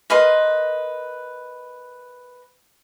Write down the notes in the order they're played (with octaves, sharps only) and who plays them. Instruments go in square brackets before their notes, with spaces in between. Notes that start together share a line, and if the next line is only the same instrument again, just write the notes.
[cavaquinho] A#4 B4 D#5 C6